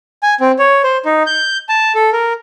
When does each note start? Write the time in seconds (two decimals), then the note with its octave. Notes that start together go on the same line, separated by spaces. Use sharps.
0.23 G#5
0.40 C4
0.59 C#5
0.84 C5
1.05 D#4
1.26 G6
1.69 A5
1.95 A4
2.13 A#4